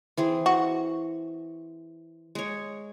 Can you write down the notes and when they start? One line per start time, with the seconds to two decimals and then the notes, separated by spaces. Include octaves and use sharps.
0.17 E3 C4 G#4
0.46 F#4
2.35 G#3 C#5